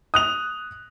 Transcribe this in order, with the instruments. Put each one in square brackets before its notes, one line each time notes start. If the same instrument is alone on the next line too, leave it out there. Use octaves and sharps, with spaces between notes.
[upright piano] D#6 F#6 F7